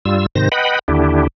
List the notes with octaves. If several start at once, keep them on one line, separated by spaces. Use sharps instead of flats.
G2 G3 F4 E6
G#2 C3 D#3 C5 A#6
B4 D#5 F#5 G5 B5
D#2 D3 D4 E4 G4